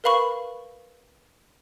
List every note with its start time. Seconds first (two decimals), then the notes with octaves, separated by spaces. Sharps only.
0.04 A#4 B4 F5 B5 C#6